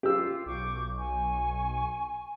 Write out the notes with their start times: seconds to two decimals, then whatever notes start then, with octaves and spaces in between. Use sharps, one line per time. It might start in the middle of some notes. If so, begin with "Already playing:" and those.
0.03 F4 G4 E6
0.46 B1 C#6 D6 G6
0.97 G#5 C#6